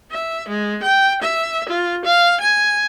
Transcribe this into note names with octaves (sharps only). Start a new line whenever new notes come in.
E5
G#3
G5
E5
F4
F5
G#5